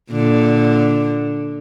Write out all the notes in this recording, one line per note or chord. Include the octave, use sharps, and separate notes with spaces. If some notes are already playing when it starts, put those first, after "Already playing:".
A#2 D3